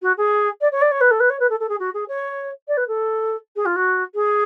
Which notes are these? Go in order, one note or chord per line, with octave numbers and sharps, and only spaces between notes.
F#4
G#4
D5
C#5
D5
C#5
B4
A4
B4
C#5
B4
A4
A4
G#4
F#4
G#4
C#5
D5
B4
A4
G#4
F4
F#4
G#4